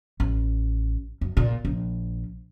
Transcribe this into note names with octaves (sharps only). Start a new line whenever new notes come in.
A1
F#2
A#2
A#1